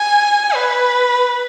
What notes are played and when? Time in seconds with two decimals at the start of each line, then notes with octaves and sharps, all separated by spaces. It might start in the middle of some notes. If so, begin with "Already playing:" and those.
Already playing: G#5
0.55 B4